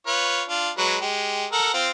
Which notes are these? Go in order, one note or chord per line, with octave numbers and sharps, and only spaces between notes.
F4 B4 C#5
D4 F4
F#3 G#3 B4
G#3 G4
A4 A#4 F#5
C4 F4